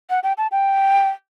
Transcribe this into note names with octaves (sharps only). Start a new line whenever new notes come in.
F#5
G5
A5
G5